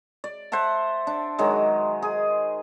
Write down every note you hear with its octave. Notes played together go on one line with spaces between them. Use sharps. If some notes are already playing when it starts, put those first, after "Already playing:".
D5
C5 E5 F#5 A5
D4
D#3 F#3 G#3
G#4